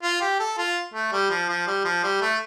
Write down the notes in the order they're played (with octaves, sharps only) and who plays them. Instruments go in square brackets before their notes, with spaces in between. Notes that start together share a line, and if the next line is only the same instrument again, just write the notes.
[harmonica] F4
G4
A4
F4
A3
G3
F3
F3
G3
F3
G3
A3